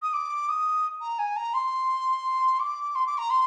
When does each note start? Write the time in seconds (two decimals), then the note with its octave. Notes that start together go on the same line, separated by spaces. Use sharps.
0.02 D#6
0.13 D6
0.49 D#6
1.01 A#5
1.19 G#5
1.36 A#5
1.54 C6
2.59 D6
2.95 C6
3.06 D6
3.18 A#5
3.30 C6